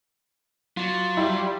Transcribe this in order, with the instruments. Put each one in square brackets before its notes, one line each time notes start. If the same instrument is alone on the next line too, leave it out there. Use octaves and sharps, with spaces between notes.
[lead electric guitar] F#3 [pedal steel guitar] F4 D5
[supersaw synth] G3 [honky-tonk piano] E4